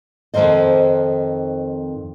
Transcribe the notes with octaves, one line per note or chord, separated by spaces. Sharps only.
F2 B2 D#3 C5 D#5